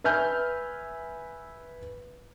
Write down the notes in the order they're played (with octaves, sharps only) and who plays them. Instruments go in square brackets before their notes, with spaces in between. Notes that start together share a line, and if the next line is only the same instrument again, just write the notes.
[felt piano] B4 E5 G#5 F6 G6